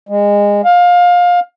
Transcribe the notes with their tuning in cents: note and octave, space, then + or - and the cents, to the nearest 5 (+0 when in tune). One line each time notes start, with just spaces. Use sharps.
G#3 -25
F5 +20